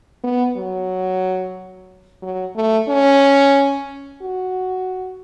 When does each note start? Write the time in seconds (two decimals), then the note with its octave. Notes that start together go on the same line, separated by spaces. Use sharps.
0.24 B3
0.57 F#3
2.22 F#3
2.55 A3
2.89 C#4
4.21 F#4